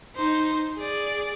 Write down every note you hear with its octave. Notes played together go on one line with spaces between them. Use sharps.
D#4 C5
G#4 D5